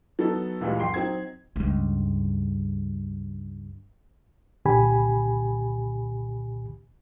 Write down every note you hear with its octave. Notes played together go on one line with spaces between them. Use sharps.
F#3 B3 D#4 A4
D2 A#2 E3 G3 G#3
F#1 G5 C6 C7
F#3 C4 D#4 G#6
C#2 G2
C2 A#2 D3 G4 G#5 B5